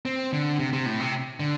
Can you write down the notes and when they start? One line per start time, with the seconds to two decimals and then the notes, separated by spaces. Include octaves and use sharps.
0.05 C4
0.33 D3
0.59 C3
0.73 C3
0.86 A2
1.00 C3
1.40 D3